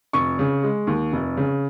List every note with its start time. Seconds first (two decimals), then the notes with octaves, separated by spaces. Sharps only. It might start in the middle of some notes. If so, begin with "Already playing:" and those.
0.13 F1 C#6
0.39 C#3
0.63 G#3
0.87 D#2
1.13 F1
1.37 C#3